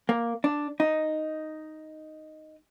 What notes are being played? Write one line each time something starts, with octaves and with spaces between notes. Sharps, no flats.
A#3
D4
D#4